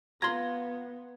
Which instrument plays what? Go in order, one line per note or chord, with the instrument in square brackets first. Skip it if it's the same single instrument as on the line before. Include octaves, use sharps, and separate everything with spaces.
[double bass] B3 [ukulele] F4 [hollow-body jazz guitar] A#5 C6 [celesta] G#6